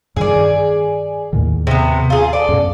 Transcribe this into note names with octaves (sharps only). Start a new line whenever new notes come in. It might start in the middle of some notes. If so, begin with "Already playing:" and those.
G2 D#3 G#4 D5
D#2 A2 D#3
C3 B3
F4 G#4
A4 D5
F#2 B2